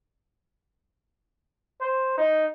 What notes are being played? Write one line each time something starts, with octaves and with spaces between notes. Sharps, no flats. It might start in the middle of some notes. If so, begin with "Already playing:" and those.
C5
D#4